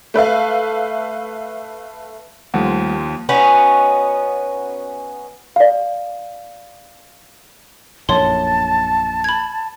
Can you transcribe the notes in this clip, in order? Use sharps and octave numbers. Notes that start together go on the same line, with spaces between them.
A3 B4 E5 F5
D#2 F3 G3 A3 F#5
B3 C#4 D#4 F#4
D5 F5
A#1 F#2 A2 C#5 A5 C6
B5 G#6